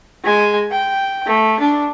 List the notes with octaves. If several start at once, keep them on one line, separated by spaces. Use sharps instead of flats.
G#3 G#5
G5
A3
D4